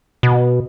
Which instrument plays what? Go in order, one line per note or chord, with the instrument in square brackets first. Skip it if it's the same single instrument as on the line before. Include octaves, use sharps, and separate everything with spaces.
[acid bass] B2